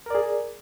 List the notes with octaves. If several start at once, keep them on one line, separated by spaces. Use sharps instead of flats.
G#4 A#4 D5